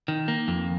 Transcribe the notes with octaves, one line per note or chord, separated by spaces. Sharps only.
D#3
A#3
F2